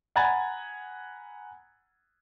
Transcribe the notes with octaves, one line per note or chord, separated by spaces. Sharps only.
F#5 G#5 A#5 B5 G#6 A6